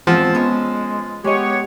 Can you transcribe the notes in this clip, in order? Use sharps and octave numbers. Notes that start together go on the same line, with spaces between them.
E2 F3 G#3 C4 F#5
G#3 B3 C#4
G#3 B3 G4 C#5 D#5